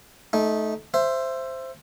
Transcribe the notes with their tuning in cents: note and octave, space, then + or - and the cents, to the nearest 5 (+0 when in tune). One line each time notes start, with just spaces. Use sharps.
A3 -20 D#4 +0
C5 +0 E5 +20